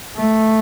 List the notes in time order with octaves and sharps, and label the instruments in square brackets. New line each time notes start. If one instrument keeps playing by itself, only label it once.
[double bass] A3